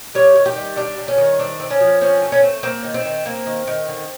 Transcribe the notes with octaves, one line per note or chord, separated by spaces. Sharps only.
G3 C#5
D#3
G4
G3
G3 D4
G3
C#4
D#3
C4 D4
C4
C#4
F3
C4 C#4
A3
C#4
C4
A#3 C4
D#3
C4
D#3
A#3
D#3
D#3
D3